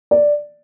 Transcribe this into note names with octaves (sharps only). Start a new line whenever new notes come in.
D5